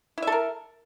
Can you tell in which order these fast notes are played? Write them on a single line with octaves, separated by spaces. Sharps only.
E4 E5 A4 A#4